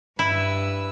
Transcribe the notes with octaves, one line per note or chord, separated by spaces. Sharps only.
G2 E4 B4 E6